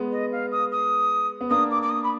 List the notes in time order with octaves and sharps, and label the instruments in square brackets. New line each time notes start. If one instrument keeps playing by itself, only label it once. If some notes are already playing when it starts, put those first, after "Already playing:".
Already playing: [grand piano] G#3 B3
[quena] D#5
F5
D#6
D#6
[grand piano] B3
[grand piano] A#3 D4 [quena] D#6
[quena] D6
D6
D#6
B5